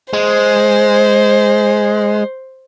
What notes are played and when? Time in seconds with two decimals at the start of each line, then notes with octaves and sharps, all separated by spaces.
0.13 G#3 C5